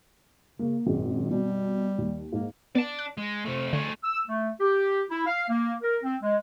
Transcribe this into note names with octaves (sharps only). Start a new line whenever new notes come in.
C#3 A#3
G#1 F#2 A#2 G#3
B2 G3
D#2
G#2 A#3
B3 D5 A5
F#6
G#3
C3 A3
D3 A3 G#4
E6
A3
G4
E4
F5
A#3
A#4
C4
G#3